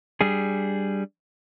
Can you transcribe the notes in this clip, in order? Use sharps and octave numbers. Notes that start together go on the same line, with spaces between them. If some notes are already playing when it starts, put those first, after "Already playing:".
G3 D4 G#4